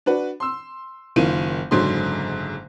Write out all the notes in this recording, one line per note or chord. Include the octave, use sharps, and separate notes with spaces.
D4 F#4 B4
C6 E6
F#1 D#3 F4 D#7
F#1 G#2 D3 F#3 C6